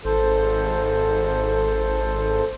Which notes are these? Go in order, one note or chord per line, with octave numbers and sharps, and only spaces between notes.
G#1 A4 C5